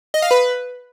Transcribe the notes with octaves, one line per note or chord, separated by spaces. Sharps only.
D#5
F5
B4